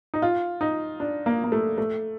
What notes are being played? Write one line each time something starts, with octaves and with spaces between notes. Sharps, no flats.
D#4
F4
D#4
D4
A#3
A#3
A3
A3